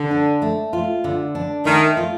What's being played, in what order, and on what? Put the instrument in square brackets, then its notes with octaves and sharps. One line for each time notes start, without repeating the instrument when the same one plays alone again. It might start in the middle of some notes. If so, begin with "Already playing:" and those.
Already playing: [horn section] D3
[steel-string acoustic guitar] D4
A3
F4
D3
D4
[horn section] D#3 [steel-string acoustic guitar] A3
[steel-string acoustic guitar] F4